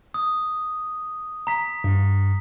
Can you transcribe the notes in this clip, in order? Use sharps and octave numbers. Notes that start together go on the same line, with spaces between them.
D#6
A#5 B6
G2